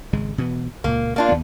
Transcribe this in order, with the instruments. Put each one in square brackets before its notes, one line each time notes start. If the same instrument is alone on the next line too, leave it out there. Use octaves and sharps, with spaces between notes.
[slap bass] G#1 C#3 G#3
B2 E3 B3
[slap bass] C#2 A#2 [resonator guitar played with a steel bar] A#3
[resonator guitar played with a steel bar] A#3 D4 F4
[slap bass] D#2 B3